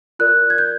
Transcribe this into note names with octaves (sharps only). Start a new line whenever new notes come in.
F4 A#4 D5 F#6
G#6
G6